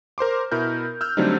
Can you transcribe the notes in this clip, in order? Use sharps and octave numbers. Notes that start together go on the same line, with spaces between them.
A#4 C5 C6 D6
B2 E4 A#4 F6 G6
E6 F6 G6
D3 F#3 G3 A3 C4 D#4